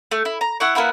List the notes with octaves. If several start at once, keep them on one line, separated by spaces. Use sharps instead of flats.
A3
E4
A#5
E4 F#5 C#6
A#3 B3 E4 F#5